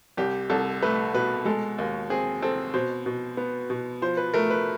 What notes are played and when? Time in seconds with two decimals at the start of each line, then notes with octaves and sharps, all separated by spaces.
0.17 C2 G4
0.50 C2 A4
0.82 A3 B4
1.14 B2 B4
1.45 G#3 A4
1.78 D#2
2.10 C4 G#4
2.42 C4 A4
2.74 B2 C5
3.06 B2
3.37 B3
3.70 B2
4.02 F3 C5
4.17 B4
4.34 A3 A#4
4.50 B4